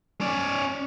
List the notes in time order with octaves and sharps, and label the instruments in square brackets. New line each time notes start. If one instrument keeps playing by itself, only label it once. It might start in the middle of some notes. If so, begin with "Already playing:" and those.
[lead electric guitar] C#4 D5